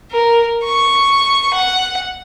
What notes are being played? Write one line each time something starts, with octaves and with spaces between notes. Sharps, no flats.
A#4
C#6
F#5